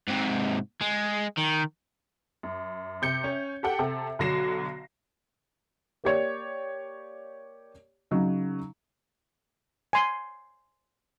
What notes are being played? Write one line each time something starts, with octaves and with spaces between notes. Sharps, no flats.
G#2 C3
G#3
D#3
F#2
C3 G6 C#7
C#4
G4 A4 F#5 G5
C3 A4
B1 D3 F#3 A#6 C7 E7
A#3 G4 C#5 D5
C#3 F#3 D#4
G#5 C6